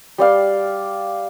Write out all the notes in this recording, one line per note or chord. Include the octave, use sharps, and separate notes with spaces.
G3 D5 F5 G5